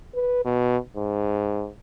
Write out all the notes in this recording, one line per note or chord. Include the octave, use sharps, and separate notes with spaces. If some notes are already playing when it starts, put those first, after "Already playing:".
B4
B2
G#2